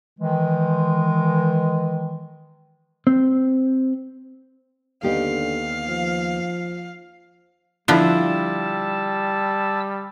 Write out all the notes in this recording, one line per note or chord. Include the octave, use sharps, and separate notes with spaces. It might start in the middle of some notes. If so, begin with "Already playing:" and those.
D#3 E3 G#3
C4
D#2 D3 B3 G4 F5
F3
D3 F3 G3 B3 E4 F4 A5 E6